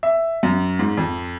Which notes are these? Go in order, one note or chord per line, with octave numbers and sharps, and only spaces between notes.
E5
F#2
G#2
F2